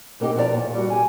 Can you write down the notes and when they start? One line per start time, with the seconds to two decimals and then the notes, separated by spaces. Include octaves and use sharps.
0.20 B2 A#3 C4 D#4 G4
0.36 B2 F3 E4 G4 D5 A#5
0.52 E2 A#2
0.75 G3 F#4
0.90 G4 G#5